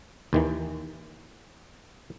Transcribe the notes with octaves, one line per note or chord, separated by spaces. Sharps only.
D#2 D#3 E3